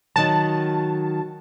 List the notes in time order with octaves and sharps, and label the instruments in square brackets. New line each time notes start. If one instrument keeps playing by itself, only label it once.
[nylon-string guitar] D#3 F#3 [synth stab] A5